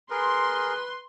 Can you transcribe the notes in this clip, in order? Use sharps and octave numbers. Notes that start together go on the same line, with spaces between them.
G#4 A#4 B4 C6